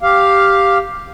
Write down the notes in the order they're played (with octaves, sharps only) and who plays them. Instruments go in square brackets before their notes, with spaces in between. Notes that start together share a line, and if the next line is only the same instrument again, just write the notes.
[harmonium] G4 F5